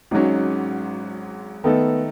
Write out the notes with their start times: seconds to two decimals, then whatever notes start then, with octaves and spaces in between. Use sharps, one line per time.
0.11 G#1 G#2 F#3 C#4 D#4
1.64 D#3 A3 B3 D#4 A4